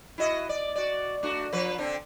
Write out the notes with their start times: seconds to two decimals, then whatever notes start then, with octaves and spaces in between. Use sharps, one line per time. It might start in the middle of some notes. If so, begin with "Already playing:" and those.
0.18 E4 F#4 D#5
0.49 D5
0.76 F#4 D5
1.23 A3 D4 F#4
1.52 F3 B4
1.78 D3 C4 D4